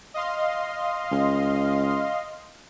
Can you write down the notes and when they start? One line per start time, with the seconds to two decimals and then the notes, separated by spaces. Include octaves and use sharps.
0.14 D#5 F5 C6
1.11 C#2